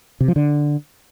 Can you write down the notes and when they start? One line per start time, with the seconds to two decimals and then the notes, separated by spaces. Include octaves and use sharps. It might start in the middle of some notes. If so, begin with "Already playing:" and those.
0.21 C3
0.28 F3
0.36 D3